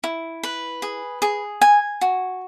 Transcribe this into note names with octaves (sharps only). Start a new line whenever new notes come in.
E4
B4
G#4
G#4
G#5
F#4